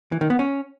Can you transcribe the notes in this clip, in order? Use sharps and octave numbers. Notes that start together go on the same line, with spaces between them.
E3
D#3
B3
C#4